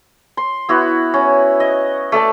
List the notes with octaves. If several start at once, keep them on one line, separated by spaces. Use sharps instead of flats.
C6
B3 E4 F#4
C#4
D#5
A3 A4 D5 A5